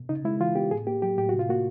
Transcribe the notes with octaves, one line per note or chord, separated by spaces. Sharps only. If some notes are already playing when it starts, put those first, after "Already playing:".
Already playing: B2
C#3 D#4
G#3 E4
E3 F4
B3 G4
A2 G#4
A#3 G4
F#3 G4
A2 G4
C3 F#4
F4
A#3 F#4